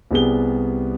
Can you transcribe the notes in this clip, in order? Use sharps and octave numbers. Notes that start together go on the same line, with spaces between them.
C2 G3 B3 G#4 G7